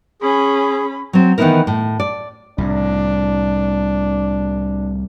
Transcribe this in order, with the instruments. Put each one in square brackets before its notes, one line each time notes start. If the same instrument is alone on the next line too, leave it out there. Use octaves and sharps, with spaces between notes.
[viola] C#4 B5 [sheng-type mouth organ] G#4
[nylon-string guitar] F#3 C4
D#3 E3 B3 D#4 E4 A#4
A2
D5
[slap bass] C2 A2 [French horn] D4